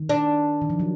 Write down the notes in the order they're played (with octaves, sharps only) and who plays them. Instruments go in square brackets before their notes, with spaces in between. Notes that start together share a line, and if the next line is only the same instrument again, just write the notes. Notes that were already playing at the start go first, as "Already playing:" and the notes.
Already playing: [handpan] D#3
[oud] D4
[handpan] D#3
F3
F#3